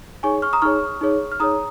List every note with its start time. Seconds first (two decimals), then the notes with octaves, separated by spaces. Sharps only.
0.23 D#4 G#4 C#5 G#5 C#6
0.42 C#6 F6
0.53 A#5 D#6
0.62 D#4 G#4 C#5 C#6 F6
1.01 D#4 G#4 C#5
1.32 F6
1.40 D#4 G#4 C#5 A#5 D#6